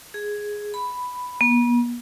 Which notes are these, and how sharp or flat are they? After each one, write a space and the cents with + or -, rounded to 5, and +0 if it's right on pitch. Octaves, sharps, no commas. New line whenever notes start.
G#4 +0
B5 +5
B3 -45